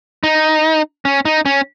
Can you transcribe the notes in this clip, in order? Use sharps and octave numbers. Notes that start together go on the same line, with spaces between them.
D#4
C#4
D#4
C#4